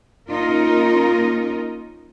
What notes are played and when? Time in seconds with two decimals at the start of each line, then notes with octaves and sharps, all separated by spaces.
0.29 A#3 C#4 D#4 F4 A#4